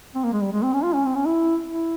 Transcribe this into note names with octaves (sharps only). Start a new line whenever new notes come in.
C4
A#3
G#3
G3
G#3
C4
C#4
F4
C#4
C4
C#4
E4
E4